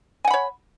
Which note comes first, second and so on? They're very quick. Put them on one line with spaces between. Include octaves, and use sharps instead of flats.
G#5 F#5 B5 C#5